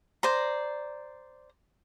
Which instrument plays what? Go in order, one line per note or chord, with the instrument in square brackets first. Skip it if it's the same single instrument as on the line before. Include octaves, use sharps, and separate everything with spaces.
[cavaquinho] C5 D5 A#5